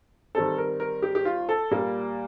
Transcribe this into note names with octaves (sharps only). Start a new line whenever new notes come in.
D#3 G3 C4 A4
A#4
A#4
G4
G4
F4
A4
A#2 G3 A#3